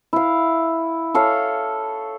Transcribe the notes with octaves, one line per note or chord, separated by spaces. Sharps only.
E4 F5
A4 C#5 F5